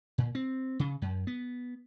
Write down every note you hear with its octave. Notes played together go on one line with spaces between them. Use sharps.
A#2
C4
C#3
F#2
B3